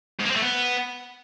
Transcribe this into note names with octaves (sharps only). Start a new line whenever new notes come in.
G#2
A#3
C4
A3
B3